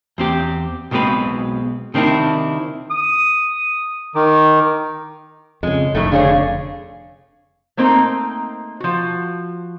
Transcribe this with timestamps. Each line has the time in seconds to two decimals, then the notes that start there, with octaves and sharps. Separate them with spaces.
0.18 E2 C4 G4
0.91 B1 B2 G#3 C4 B4 B5
1.94 C3 D#3 C4 D4 E4
2.91 D#6
4.15 D#3 D6
5.63 F2 C#3 G#3
5.95 F1 A2 D#3 A3
6.12 D3 G#4 C#5 F5
7.77 A3 A#3 C4 D#4 C5 A#5
8.80 F3 F#4